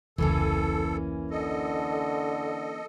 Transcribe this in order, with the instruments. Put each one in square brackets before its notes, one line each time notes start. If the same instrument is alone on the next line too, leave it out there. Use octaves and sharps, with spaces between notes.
[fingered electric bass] F1 C#2 [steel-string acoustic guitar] E3 A#3 C#4 [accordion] A4
[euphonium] D3 [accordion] A4 D#5